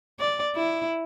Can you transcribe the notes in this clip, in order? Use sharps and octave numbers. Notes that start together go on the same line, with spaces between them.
D5
E4